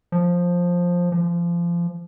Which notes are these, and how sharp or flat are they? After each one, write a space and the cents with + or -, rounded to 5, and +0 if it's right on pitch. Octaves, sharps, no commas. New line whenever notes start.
F3 +10
F3 -25